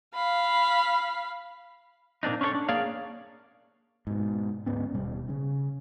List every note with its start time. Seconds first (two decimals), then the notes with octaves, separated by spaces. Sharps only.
0.14 F5 B5
2.23 A#2 A#3 C4 D4 D#4
2.41 C#4 D4 E4 A4 C#5
2.55 D4
2.69 A#3 G#4 C#5 D5 F5
4.07 G#2 B2
4.66 D2 G#2 B3 C#4
4.93 D#1 B2 G3
5.29 C#3 C#4